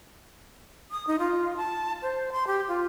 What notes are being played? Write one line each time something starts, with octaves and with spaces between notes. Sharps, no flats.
D#6
D#4
F4
A5
C5
C6
G4
F4